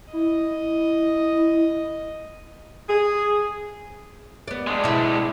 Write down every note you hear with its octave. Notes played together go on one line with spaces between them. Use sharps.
E4 D#5
G#4
B3 D5
G#3 D4
B2 E4